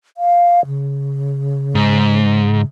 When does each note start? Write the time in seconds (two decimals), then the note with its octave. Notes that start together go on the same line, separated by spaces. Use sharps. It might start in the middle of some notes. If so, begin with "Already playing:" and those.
0.17 F5
0.66 C#3
1.75 G#2